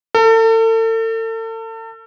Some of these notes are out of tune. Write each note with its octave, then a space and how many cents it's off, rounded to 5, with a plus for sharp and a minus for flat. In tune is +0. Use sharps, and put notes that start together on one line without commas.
A4 +40